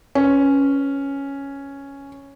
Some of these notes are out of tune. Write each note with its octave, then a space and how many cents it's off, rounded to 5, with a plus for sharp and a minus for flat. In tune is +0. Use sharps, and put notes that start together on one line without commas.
C#4 +0 B4 +0